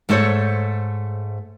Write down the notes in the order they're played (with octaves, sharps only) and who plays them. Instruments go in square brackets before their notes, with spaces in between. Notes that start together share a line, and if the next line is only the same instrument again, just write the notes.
[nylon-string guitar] G#2 A3 A4 C5 C#5